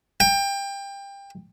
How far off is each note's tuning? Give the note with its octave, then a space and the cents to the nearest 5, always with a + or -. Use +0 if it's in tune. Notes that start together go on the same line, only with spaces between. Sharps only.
G5 +25